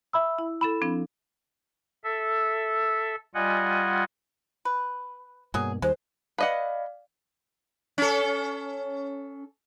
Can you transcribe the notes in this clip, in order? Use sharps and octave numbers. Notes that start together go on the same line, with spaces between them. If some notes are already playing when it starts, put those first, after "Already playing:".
E5 B5 E6
E4
E4 A4 B5 E7
F3 C4 D4
A4 E5
G3 F4 D#5 F#5 G#5
B4
G2 B2 F#3 A#3 G#4
D#2 D#3 G3 G#3 C5
B4 D5 D#5 F5 F#5
C#4 A4